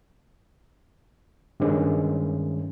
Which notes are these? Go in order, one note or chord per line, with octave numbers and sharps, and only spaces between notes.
G2 D#3 G#3 C#4